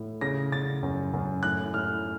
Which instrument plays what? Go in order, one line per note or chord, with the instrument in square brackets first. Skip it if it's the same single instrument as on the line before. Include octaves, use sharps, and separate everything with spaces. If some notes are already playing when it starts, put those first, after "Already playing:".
Already playing: [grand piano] A2
C#3 A#6
C#3 A6
F#2
F#2
A2 F#6
A2 F6